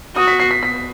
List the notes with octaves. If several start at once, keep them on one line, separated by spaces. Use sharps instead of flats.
F#4 D#6
B6
C7
B6
B6